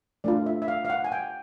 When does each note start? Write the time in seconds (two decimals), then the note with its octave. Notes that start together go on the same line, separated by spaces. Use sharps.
0.24 A3 D4 F4 D5
0.46 E5
0.62 E5
0.68 F5
0.85 F5
0.90 F#5
1.04 G#5
1.12 G5